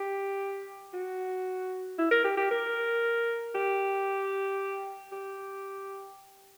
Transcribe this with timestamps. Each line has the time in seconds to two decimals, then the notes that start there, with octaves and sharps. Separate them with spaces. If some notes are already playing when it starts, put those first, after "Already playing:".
Already playing: G4
0.93 F#4
1.98 E4
2.11 A#4
2.24 G4
2.37 G4
2.51 A#4
3.55 G4
5.12 G4